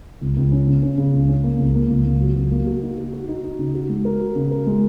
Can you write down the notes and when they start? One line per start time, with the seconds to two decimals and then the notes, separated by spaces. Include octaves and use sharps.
0.21 C#2
0.37 C#2
0.52 C#4
0.67 C#3
0.83 C#4
0.98 C#3
1.13 C#2
1.29 C#4
1.44 A#3
1.59 C#2
1.75 A#3
1.90 C#2
2.06 C#2
2.21 F#3
2.36 C#2
2.51 A#3
2.67 F#4
2.82 D#4
2.97 F#4
3.13 F#4
3.28 D#4
3.43 D#4
3.59 C#3
3.74 F#4
3.89 G#3
4.05 A#4
4.20 F#4
4.36 C#3
4.51 A#4
4.67 G#3